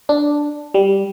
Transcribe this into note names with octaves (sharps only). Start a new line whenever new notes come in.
D4
G3